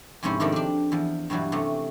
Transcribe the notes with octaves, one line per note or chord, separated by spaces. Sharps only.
F2 G#2 C3 C#4 E4 C5
C3 D#3 F3 D4 A4
C4 D4
E2 F3
G2 B2 E3 F#3 G3
C3 A3 C4 C#4